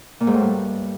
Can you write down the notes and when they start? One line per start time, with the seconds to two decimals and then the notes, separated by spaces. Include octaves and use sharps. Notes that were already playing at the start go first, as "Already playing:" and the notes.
0.20 A#2
0.27 G#2
0.34 A2
0.40 G2